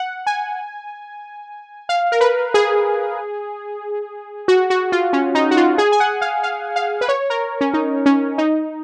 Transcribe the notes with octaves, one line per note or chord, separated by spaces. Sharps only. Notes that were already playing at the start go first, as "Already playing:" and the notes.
Already playing: F#5
G#5
F5
A#4
B4
G#4
F#4
F#4
F4
C#4
D#4
F#4
F4
G#4
G#5
F#5
F5
F5
F5
B4
C#5
A#4
C#4
D#4
C#4
D#4